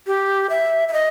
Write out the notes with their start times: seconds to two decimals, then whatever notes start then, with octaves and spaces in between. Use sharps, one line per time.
0.07 G4
0.50 E5
0.88 E5
0.93 D#5